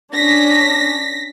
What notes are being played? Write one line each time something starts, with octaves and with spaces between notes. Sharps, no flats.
C#4 D4 A#6 B6